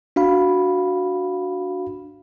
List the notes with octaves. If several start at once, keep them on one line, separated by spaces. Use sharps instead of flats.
D4 F#4 F5 B5